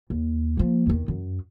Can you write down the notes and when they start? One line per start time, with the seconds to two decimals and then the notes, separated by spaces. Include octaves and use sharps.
0.10 D#2
0.57 F3 A#3
0.87 E2 D#3
1.08 F#2